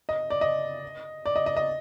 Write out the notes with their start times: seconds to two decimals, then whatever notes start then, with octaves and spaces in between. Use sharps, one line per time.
0.09 D#5
0.30 D5
0.41 D#5
1.26 D5
1.36 D#5
1.46 D#5
1.56 D#5